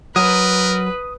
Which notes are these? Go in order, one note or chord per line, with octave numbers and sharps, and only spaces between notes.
F#3 A#4 B4 D#6